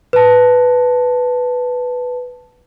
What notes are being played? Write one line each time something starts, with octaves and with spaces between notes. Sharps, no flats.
B4 A5